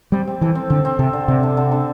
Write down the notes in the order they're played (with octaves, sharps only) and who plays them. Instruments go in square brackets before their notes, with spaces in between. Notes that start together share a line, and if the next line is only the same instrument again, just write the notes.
[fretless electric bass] G3 [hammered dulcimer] C4
[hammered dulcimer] C4
[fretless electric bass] E3 [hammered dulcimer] A4
[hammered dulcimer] C4
[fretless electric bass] D3 [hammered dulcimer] C4
[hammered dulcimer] C4
[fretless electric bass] C3 [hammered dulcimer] A4
[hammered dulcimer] D3
[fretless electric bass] C3 [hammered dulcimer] C4
[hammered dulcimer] D3
D3
D3